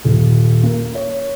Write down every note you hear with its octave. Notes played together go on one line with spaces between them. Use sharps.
D#1
A#3
C#5